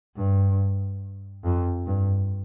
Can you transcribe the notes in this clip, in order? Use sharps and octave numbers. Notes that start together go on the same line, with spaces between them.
G2
F2
G2